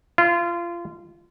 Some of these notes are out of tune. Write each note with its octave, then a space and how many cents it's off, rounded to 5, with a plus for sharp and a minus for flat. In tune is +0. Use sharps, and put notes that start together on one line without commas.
F4 -25